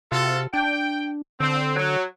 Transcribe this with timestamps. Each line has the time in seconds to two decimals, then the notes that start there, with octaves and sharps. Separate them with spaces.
0.12 C3 F4 F#4 A4
0.54 D4 G5
1.40 D3 C4
1.76 F#3